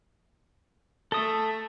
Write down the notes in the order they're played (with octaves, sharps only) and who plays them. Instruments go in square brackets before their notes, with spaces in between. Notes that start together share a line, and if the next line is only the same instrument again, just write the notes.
[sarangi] A3 [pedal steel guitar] A4 D#6